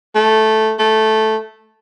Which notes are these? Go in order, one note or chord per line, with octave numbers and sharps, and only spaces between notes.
A3
A3